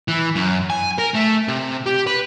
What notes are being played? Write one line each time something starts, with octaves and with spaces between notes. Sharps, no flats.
E3
F#2
G#5
A#4
A3
C3
G4
B4